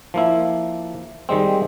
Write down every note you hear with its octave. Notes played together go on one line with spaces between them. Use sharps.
F3 A#3 E4
D#3 G3 G#3 C4